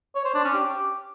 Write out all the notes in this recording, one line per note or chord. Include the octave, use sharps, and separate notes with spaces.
C#5
C5
D4
C#4
G4